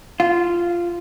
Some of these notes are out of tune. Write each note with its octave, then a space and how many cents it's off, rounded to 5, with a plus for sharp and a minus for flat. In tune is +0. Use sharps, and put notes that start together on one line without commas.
F4 -10